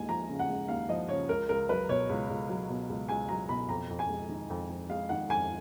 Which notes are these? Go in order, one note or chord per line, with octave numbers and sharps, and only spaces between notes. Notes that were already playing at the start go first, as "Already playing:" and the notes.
Already playing: D#2 G#3 G#5
F3 A#5
C#3
F#5
G#3
D#2 F5
F3 D#5
C#3 C#5
C#2 A#4
C#2 A#4
F#3 B4
B2 C#5
C#2
C#2
F#3
B2
C#2
C#2 G#5
F#3 A#5
B2 B5
F2 A#5
F2
G#5
G#3
D#3
F2
F2
G#3 F5
D#3 F#5
F2 G#5